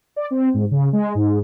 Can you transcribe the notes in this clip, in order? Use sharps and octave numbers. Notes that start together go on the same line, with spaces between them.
D5
C4
G#2
C#3
G#3
G#2